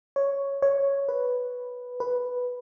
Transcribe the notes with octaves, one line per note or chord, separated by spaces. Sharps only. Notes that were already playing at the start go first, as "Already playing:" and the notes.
C#5
C#5
B4
B4